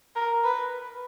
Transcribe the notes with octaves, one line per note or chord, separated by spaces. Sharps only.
A#4
B4